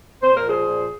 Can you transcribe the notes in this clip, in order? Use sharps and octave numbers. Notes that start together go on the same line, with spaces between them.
A#2 C5
A#4
F3 G#4 C5
A#2